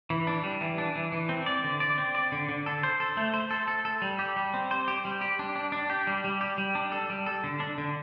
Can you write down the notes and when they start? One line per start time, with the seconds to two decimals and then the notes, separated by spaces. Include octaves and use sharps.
0.10 E3
0.27 D4
0.43 G3
0.61 E3
0.78 D4
0.95 E3
1.12 E3
1.29 C4
1.46 D5
1.64 D3
1.80 D5
1.98 C4
2.15 D5
2.32 D3
2.49 D3
2.66 A4
2.83 C5
3.00 A4
3.17 A3
3.34 C5
3.51 A4
3.68 A4
3.85 A4
4.02 G3
4.19 G4
4.37 G3
4.54 C4
4.71 C5
4.88 G4
5.05 G3
5.21 G4
5.39 D4
5.56 D4
5.72 D4
5.90 G4
6.07 G3
6.24 G3
6.41 G4
6.58 G3
6.75 D4
6.92 A4
7.10 G3
7.26 A4
7.44 D3
7.60 D4
7.78 D3